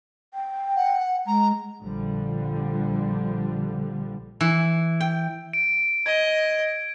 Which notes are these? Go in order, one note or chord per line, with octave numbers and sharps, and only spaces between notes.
G5
F#5
G#3 A#5
A#1 D3 F3 G3
E3
G5
D7
D#5 G#6